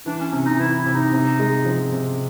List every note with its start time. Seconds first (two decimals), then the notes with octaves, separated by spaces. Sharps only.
0.06 E3 D4
0.20 C#4
0.32 C3 C#4
0.46 D#4
0.59 E3 E4
0.77 E4
0.86 C3
0.94 D#4
1.13 C3
1.39 G#3
1.65 F3
1.93 C3